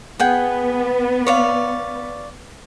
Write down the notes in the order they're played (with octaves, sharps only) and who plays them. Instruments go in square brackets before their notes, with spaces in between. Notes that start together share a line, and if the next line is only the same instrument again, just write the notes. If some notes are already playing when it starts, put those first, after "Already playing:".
[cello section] B3 [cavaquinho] G#4 F#5 G5
[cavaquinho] C#5 D5 F5